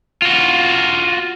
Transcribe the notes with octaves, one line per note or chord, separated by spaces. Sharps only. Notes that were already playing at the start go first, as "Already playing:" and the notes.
F4 F#4